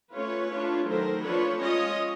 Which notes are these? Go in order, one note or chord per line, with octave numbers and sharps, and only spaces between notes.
A3 C#4 F4 B4 C#5
A3 D4 F4
D#3 F#3 A3 A#4 C5
F3 A3 D4 F4 B4 C#5
G#3 C#4 F4 C#5 D#5